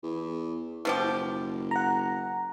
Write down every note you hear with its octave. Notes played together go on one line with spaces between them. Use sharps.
E2
F#1 B2 F3 G4
F#5 A#5